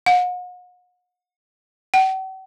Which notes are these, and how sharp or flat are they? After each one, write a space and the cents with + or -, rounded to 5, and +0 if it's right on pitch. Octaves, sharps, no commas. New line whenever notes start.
F#5 -40
F#5 +45